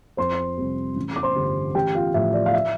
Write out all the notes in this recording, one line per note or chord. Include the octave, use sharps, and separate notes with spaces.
F2 C5 C6
C3 G3 C4
A1
D6
C5 C6
G2 D3 G3
A1 G4 G5
F4 F5
A2 F3 E5
D5
F5
E5